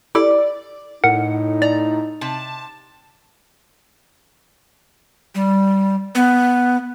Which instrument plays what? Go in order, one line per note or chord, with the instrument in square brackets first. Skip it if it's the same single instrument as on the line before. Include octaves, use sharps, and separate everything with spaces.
[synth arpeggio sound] E4 G4 A4 [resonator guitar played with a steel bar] D5
[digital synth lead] A2 [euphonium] D#4 [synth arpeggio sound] A#4 F#5 C#7
[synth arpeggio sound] D5 [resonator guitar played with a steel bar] A#5
[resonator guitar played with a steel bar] C3 [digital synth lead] A5
[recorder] G3
B3